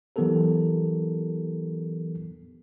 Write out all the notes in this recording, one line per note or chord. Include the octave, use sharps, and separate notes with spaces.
E3 F#3 B3 G4 A4 A#4